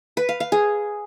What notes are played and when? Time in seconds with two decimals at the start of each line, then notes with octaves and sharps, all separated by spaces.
0.17 B4
0.29 F5
0.40 F5
0.52 G#4